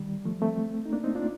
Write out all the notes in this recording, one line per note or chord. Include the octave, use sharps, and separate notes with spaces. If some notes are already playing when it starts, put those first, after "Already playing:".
Already playing: D#3 G3
F3 A3
A3 C4
D#4
A#3 D4
C4 D#4
D4 F4